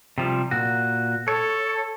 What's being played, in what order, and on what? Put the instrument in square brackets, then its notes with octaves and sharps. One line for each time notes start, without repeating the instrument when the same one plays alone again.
[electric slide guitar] C3 F3 G3
A#2 F#4
[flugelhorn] A4 [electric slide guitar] C#5